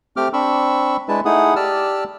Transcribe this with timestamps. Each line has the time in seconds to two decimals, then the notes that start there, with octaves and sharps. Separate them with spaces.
0.17 A3 C4 G4 G5 D6 F6
0.33 C4 D4 B5 C#6 E6
1.08 G#3 D4 E4 B4 A5
1.25 A3 D#4 E4 G#4 F#5 D#6
1.56 G4 D5 A5 E6 F6